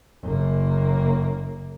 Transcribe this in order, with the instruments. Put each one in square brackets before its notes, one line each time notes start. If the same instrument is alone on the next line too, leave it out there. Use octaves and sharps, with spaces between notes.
[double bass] F#1 A#3